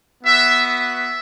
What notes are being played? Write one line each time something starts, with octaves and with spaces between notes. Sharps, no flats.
B3 F#4 E5
E5